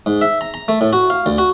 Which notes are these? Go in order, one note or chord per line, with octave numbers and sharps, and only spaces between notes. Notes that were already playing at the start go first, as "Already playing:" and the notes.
G#2
E5
A#5
A#5
A3
A2
F#4
F5
D2
F#4